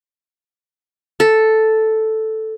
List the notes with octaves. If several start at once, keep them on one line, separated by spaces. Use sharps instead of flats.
A4